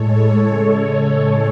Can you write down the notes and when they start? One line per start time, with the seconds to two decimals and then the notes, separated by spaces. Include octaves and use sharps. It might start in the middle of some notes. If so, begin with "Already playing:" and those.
Already playing: A2 G#3 A4 C#5
0.43 C#3 G#3
1.10 A2 G#3